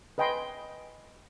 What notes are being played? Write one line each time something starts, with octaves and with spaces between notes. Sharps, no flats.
B4 D#5 G5 G#5 B5 C6